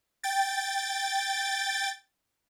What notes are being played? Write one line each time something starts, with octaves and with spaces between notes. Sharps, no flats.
G5 A6